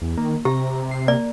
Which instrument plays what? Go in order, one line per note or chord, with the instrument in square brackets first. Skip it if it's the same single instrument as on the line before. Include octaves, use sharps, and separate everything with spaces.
[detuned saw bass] E2
[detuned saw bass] D#3 [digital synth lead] A#3
[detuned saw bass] C3 [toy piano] G4 [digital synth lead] A#5
[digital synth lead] C7
[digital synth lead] A#3 [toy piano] D5